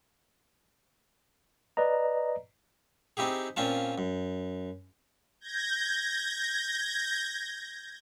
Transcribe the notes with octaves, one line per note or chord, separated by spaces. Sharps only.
B4 D5 D#5 A#5
C4 D#4 E4 G4 G#4
A#2 C4 C#4 F4 A5
F#2
G6 G#6 A#6